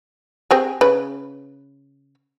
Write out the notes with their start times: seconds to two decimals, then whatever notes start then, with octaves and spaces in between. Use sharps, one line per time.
0.51 C4 G4 G#4
0.81 C#3 B4